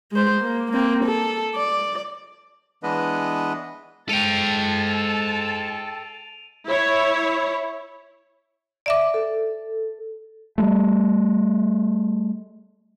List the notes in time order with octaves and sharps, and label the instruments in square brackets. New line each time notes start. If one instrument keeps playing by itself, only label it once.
[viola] G#3 C5
A#3
A#3 C4
A4
D5
[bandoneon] E3 G#3 B3 D4 B4 D#5
[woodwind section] G#2 G#3 [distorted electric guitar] A4 G5 [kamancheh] A5 [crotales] D7 D#7 F7
[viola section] E4 C#5
[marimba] D5 E5 D6
[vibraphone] A4
[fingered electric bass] G3 A3